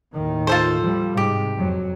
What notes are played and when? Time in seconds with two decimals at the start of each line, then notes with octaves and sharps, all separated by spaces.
0.13 D#2 A2 D#3
0.47 F4 A4 C5
0.79 F3 G3
1.17 G#2 C3 G4
1.55 F2 F#3